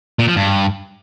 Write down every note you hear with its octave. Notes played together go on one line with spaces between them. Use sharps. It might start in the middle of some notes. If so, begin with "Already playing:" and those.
A#2
F3
G2